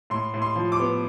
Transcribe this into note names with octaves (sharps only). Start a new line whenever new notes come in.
A2 C6
A2
C6
F3
D6
B3